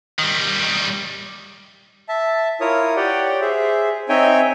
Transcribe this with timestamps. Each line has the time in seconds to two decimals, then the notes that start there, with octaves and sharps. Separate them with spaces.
0.19 D#3 G3
2.09 E5 A5
2.61 E4 F4 A#4 C#5 D#6
2.96 G4 C#5 D5 F#5 G5
3.41 G#4 C5 E5
4.09 C4 D#4 C#5 E5 G5 G#5